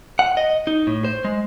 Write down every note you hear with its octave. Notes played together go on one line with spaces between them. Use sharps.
F#5
D#5
D#4
A2
C5
G#3